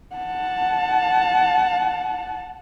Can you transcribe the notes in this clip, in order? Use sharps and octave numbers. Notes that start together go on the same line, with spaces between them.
F#5 A5